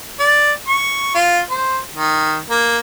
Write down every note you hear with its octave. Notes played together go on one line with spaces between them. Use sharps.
D5
C#6
F4
C5
D#3
A#3